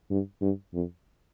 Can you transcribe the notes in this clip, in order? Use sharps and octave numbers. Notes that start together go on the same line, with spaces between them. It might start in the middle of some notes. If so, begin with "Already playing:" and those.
G2
G2
F2